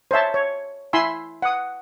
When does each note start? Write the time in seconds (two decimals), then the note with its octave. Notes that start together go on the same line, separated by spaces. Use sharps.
0.11 C5 C#5 E5 A5
0.34 C#5
0.93 E4 G#5 B5 C6 E6
1.42 F#5 D#6